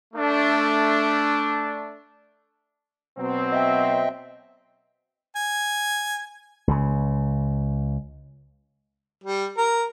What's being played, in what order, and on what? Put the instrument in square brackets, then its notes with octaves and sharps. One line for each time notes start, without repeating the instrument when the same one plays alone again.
[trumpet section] A3 D4
[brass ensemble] B2 F#3 C4
[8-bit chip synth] D#5 E5 G5
[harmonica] G#5
[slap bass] C#2 C#3
[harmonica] G3
A#4